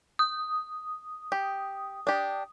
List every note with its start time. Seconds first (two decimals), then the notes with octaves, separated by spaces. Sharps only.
0.19 D#6
1.32 G4
2.07 D4 G4